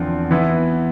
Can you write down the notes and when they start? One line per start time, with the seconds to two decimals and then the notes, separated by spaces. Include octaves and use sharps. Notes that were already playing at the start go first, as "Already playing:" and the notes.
Already playing: E2 D3 F3 C4
0.31 E3 B3 E4